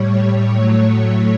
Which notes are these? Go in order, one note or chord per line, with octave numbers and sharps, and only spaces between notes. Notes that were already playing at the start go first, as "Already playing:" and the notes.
Already playing: A2 G3 C#5
A2 F#3 A3